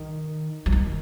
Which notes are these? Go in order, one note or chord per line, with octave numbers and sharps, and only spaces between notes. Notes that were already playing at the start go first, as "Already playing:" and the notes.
Already playing: D#3
F#3
D#3